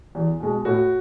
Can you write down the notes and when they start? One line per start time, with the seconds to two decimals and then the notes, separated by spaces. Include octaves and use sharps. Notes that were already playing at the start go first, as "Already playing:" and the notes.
0.15 E2
0.40 B2 G#3
0.65 A2 F#4